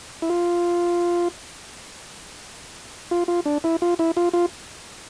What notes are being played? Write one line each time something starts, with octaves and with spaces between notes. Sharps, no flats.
E4
F4
F4
F4
D4
E4
F4
E4
F4
F4